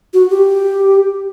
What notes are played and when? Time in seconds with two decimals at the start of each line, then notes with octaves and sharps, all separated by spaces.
0.14 F#4
0.30 G4